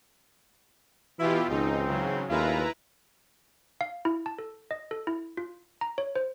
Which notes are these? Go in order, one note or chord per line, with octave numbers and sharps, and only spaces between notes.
B2 E3 E4 F4 G4
C#2 G#2 E3 C4 D#4
C#3 F#3
D#2 G#3 A3 E4 F4 B4 A#5
F5
E4
A5
A4
D#5
A4
E4
F4
A#5
C#5
C5